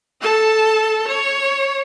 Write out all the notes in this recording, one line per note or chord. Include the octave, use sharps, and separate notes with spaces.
A4 A5
C#5